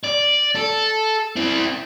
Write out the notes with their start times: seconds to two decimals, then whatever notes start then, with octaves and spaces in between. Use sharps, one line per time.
0.04 D5
0.56 A4
1.37 C4 E4